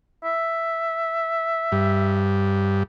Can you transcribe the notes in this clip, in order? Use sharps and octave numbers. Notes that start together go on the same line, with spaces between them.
E5
G2